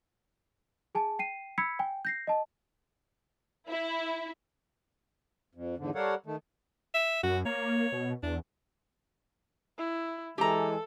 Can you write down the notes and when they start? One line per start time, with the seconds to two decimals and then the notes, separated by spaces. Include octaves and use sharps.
0.95 G#4 G#5 A5
1.19 G5 C7 D#7
1.58 B5 E6 G#6 B6 C#7
1.79 G5 G#5
2.05 G6 A#6 C7
2.27 D#5 A5
3.69 E4
5.55 F2
5.78 E2 G#2 D3
5.95 G3 A4 A#4 C#5 F5 F#5
6.26 D#3 A3
6.94 E5
7.23 F#2 F#4
7.45 A#3 C#5
7.92 B2
8.23 E2 D4
9.78 E4
10.38 E3 G#3 G4 A4 A#5